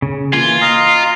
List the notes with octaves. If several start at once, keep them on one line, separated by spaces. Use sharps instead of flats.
C#3
E3 A#3 F4 G#5
D#5 F5 A#5